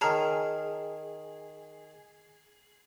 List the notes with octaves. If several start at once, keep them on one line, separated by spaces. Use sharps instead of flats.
D#3 G#4 C#5 A5 A#5 F6